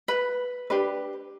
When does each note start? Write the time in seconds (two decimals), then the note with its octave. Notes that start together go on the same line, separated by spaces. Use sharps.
0.08 B4
0.70 D4 G4 B4